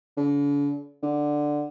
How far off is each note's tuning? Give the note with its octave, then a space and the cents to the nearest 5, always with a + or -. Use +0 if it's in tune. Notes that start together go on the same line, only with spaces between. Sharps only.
D3 -45
D3 +5